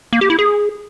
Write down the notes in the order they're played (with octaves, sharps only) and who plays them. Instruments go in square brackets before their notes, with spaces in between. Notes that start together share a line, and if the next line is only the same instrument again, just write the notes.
[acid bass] A#3
G4
E4
G#4